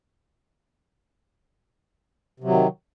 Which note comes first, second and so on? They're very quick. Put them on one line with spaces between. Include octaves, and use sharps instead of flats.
C3 F#3 D#3